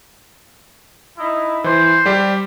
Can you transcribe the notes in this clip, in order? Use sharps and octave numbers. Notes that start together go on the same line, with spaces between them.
D#4 E4
E3 C5
G3 G4